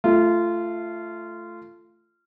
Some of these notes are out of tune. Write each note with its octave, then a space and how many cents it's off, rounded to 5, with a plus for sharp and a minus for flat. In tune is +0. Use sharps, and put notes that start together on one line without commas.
A3 +0 F4 -20